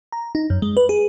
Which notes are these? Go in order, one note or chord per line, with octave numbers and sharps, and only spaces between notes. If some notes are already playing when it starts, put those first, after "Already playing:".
A#5
D#4
F#2
G#3
B4
G#4